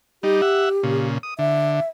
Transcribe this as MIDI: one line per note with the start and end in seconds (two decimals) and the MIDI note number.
0.23 0.41 55
0.23 0.41 63
0.23 1.06 67
0.42 0.69 76
0.42 0.69 78
0.83 1.18 46
0.83 1.18 49
1.23 1.34 87
1.39 1.80 50
1.39 1.89 76